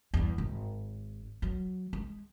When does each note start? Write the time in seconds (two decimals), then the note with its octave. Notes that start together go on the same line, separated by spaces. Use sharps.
0.14 E2 G2
0.38 G#1
1.42 F#3
1.93 G#3